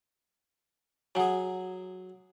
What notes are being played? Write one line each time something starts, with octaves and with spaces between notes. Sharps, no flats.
F#3 G#4 F#5 G#5